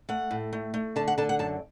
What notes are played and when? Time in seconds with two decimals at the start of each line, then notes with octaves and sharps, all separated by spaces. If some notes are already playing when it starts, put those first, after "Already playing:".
0.09 A3 F#5
0.31 A2
0.53 A3
0.74 A3
0.96 D3 A5
1.08 F#5
1.18 D3 A5
1.29 F#5
1.39 F#2 A5